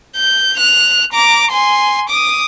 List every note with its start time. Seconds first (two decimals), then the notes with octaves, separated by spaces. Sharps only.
0.16 G6
0.58 F#6 F7
1.13 A#5 D6
1.52 G#5 C6
2.09 D6 D#6